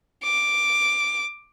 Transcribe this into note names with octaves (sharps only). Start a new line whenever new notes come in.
D6